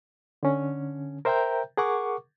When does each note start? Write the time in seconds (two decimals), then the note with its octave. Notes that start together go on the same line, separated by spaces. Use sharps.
0.43 D3 C#4
1.25 A#4 C5 E5 G5 A#5 G6
1.77 G#4 A#4 F#5 C#6 D6